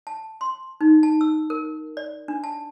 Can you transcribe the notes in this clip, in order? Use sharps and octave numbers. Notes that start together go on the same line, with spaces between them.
A5
C6
D#4
A5
E6
A#4
D5
D4
A5